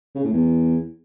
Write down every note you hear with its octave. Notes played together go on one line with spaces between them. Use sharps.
C#3
A2
E2